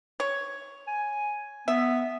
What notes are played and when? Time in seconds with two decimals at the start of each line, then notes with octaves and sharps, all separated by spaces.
0.20 C#5
0.88 G#5
1.68 B3 E5